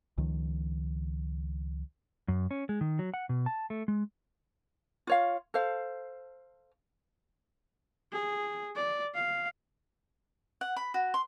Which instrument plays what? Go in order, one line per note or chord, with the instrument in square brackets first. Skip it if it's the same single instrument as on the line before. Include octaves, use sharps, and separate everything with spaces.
[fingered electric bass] C#2 D#3 F3
[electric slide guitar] F#2
C#4
G#3
D#3
F#3
F#5
B2
A5
A3
G#3
[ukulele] F4 C#5 F5
A4 C5 F5
[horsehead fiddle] G#4
D5
F5
[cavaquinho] F#5
B5
F#4
C6